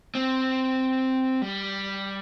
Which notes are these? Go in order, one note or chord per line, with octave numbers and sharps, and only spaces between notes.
C4
G3